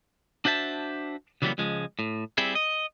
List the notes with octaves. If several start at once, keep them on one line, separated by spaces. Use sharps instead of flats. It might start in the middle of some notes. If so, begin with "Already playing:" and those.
D4 F#4 C5 E5 A5
C#3 E3 F#3 G3 A#3 B3
C#2 F3 G#3
A2
G3 C4 E4 G#4
D#5